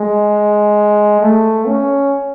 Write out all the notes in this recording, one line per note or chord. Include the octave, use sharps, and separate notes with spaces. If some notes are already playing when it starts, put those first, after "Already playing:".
Already playing: G#3
A3
C#4